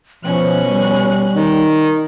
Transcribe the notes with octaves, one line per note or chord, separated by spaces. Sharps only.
B2 F3 C#4 F#6
G3
D#3